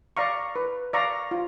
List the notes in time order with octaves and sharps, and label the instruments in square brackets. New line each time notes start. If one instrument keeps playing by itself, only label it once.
[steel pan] D5 F5 A#5 C#6
B4
D5 F5 A#5 C#6
F4